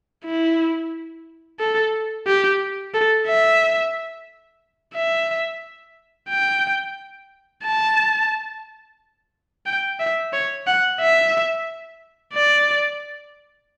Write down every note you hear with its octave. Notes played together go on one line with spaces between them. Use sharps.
E4
A4
G4
A4
E5
E5
G5
A5
G5
E5
C#5
F#5
E5
D5